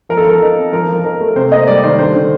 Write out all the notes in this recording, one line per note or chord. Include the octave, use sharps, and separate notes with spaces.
F3 A#4
A4
F3 A#4
D#4
C4
F3 A#4
F3
D#4 A#4
A3
C3 C5
A#3 D#5
G3 D5
D#3 C5
D3 C5
D3